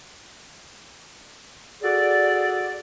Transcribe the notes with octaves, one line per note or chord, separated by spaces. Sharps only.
F#4 G#4 A4 D5